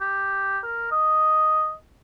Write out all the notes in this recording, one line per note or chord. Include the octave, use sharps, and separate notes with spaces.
G4
A#4
D#5